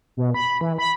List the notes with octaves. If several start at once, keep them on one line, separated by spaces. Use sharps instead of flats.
B2
B5
E3
B5